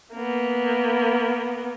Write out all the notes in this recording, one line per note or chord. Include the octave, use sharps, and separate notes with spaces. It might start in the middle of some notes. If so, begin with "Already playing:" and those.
A#3 B3